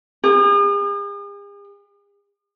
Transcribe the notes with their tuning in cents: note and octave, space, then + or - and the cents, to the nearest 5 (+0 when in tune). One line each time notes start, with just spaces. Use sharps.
G#4 -45